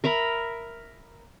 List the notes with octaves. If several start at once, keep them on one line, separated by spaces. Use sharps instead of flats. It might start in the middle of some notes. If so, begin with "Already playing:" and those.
A#4 E5 A#5 B5